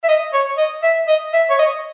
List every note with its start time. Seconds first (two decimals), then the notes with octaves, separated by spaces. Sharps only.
0.04 E5
0.09 D#5
0.33 C#5
0.57 D#5
0.83 E5
1.08 D#5
1.33 E5
1.50 C#5
1.59 D#5